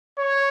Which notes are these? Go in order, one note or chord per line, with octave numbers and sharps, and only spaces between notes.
C#5